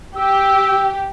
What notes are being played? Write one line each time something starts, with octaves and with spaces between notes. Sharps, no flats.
G4 E6